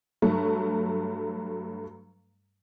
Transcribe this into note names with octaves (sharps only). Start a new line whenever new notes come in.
G2 F#3 A3